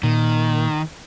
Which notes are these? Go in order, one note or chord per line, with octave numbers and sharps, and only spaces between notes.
A#2 D#3